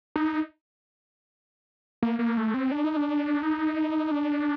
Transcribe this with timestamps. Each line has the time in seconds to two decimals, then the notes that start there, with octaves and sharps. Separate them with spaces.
0.16 D#4
2.03 A#3
2.19 A#3
2.38 A3
2.54 C4
2.71 D4
2.84 D#4
2.97 D4
3.42 D#4
4.11 D4